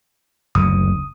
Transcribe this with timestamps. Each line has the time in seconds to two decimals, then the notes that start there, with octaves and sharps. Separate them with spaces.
0.55 F#1 D2 D#6